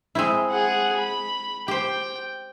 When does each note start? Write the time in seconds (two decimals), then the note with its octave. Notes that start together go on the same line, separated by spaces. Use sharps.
0.15 G#3 C4 E4
0.50 G#4 F#5
0.98 B5
1.68 G4 C5 G5